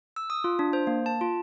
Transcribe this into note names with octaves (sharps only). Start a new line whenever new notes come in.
E6
D#6
F4
D4
C5
A#3
A5
F4